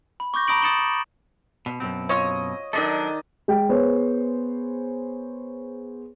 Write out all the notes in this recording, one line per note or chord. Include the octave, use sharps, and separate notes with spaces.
B5
C#6 D6 G6 A#6
A#5 B5 D#6 A#6 D7 F#7
D#6 A6 C#7 E7 F#7 G7
B2
F#2 B2 C4
F4 C#5 D#5
D#3 F#3 D4 A4 D5 D#5
G#3 G5
B3 G#4 C5 C#5